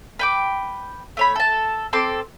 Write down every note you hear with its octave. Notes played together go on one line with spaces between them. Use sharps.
B4 G5 D6
A3 C#5 B5
A4 A5
C4 A4 C6 D6